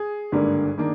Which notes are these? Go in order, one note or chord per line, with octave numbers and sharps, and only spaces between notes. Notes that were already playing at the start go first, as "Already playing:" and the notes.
Already playing: G#4
G#1 G2 D3 G3 A#3
D#3 A#3 D4